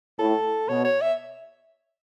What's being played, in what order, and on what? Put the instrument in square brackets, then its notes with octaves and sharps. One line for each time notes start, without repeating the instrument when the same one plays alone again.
[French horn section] A2 [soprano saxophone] A4
[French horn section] B2 [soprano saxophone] C#5
[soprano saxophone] C#5
E5